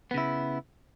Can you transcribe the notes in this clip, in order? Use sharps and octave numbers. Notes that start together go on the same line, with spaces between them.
C#3 B3 E4